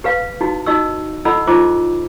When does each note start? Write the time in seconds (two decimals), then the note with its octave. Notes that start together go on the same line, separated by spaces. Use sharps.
0.04 G4 B4 F5
0.41 D#4 E4 F#4 G4
0.66 D#4 F#4 D#5 C#6 E6
1.25 E4 A4 D#5 F#5 B5 E6
1.47 D#4 F4 C5 D#5 C#6 D6